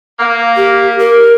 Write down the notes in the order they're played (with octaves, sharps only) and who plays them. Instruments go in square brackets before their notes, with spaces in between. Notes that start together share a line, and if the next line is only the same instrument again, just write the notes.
[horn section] A#3
[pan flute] G4
A#4